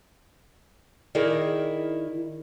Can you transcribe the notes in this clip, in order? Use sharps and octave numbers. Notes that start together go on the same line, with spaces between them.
D#3 E4 G#4 A#4 D5